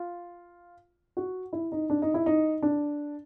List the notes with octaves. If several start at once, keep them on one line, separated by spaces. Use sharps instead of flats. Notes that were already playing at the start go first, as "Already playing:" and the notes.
Already playing: F4
F#4
E4
D#4
D4
D#4
E4
D#4
D4